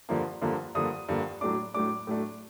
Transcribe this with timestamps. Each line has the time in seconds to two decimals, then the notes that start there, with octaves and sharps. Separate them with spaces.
0.09 G2 D3 F3 A#3
0.41 G2 D3 F3 A#3
0.75 G2 D3 F3 A#3 D#6
1.09 G2 D3 F3 A#3
1.41 A2 F#3 A3 D4 D6
1.74 A2 F#3 A3 D4 D6
2.07 A2 F#3 A3 D4